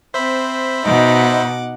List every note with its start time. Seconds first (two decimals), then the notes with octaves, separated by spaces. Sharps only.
0.14 C4 C5 E5 B5
0.85 B2 D#4 F#5 D6